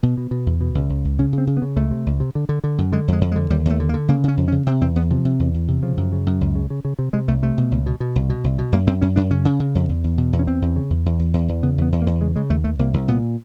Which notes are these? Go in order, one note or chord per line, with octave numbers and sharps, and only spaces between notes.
B2 B3
B2
B2
E2
B2
C#2
C#2
C#2
C#3 C#4
C#3
C4
C#3
B3
C#3
C#2 A3
C3
C#2
C3
D3
D3
D3
F#2
D3 G#3
F2
G#3
F2
G#3
D3
D#2 G3
D#2 A3
D3
A#3
D3
C#3 A#3
C#3 C#4
F2
C#4
C#3
C3 C4
E2 C4
E2 B3
C3 F3
C3
E2
E2
C3
C#3 F3
F#2
C#3
F#2
C#2
C#3
C#3
C#3
C3
C3 G#3
C2 A3
C3 A3
B2
C#2
B2
B2
C2
B2
C2
B2
F#2 A#3
F#2 C4
F#2 C#4
F#2 D4
C#3 C#4
C#3
C#3
F2
E2
E2
B2
E2
C#4
E2 C4
E2
C#3
E2
E2
E2
E2
E2
C#3 B3
E2 B3
E2
A#3
E2
C#3 G#3
C#3 G#3
D#2 A3
D#2 A3
C2 A#3
C2
A#2 B3